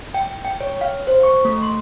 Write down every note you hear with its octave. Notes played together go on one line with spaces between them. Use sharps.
G5
G5
C#5
F5
C5
C#6
A3
C6